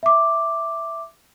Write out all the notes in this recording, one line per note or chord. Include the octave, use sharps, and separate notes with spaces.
E5 D6